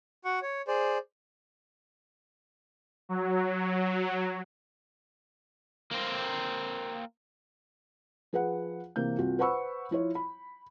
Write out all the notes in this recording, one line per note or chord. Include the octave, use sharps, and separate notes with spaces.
F#4 F#5 C#6
C#5
G#4 C5 D5
F#3
A#3 C4
F3 G#4 B4 F#5
C3 E3 A#3 G6
C2 F4 F#4
B4 C5 F#5 B5 C#6 E6
F3 E4 F4 C#5
B5